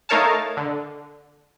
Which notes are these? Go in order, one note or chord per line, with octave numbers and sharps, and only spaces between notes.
A3 D#4 A#4 C#5 F5 A5
D3